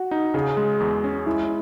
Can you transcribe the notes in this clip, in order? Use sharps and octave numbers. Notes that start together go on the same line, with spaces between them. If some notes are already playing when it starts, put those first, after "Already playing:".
Already playing: F#4
D#4
C#3 G#4
G#3
E2
C#4
G#3 E4